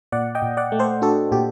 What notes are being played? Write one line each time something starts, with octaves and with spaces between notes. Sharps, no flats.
A#2 D5 F#5
D#5 G5
A#2
D5 F#5
A3
A4 C5
D4 F#4 A4
A#2 G4